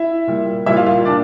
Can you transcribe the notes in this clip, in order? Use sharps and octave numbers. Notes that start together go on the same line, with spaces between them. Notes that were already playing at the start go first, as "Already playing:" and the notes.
Already playing: E4 E5
A#2 G3
A#2 G3 E4 E5
F4 F5
F4 F5
A#2 D4 D5